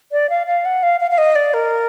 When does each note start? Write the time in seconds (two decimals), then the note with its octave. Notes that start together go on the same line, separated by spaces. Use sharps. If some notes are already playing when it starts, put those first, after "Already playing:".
0.12 D5
0.30 F5
0.47 F5
0.65 F#5
0.83 F5
1.00 F5
1.11 F5
1.18 D#5
1.36 D5
1.54 A#4